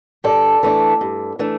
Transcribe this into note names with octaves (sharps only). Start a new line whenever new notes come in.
G2 A4 D5
E3 A3 D4
G2
E3 A3 D4